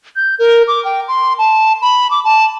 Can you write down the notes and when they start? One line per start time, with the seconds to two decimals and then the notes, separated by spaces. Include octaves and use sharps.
0.16 G6
0.39 A#4
0.68 D6
0.85 G5
1.08 C6
1.38 A5
1.82 B5
2.11 D6
2.25 A5